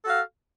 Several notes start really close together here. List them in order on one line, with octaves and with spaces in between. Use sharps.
A4 F#4 F5